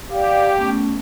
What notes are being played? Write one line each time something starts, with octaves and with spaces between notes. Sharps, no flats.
G4 D5 F5
A3 B3 C#4